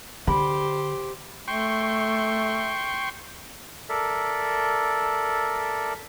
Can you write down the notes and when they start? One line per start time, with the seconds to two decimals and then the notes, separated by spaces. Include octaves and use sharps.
0.27 D3 G4 C5 B5
1.48 A3 G5 C6 C#6
3.89 A4 A#4 D5 E5